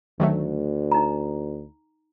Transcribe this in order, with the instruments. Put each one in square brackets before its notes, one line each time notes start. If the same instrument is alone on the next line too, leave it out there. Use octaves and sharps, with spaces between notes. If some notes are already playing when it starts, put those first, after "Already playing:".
[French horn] D2 [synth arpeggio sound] D#3 F#3 A3
[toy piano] D#4 A#5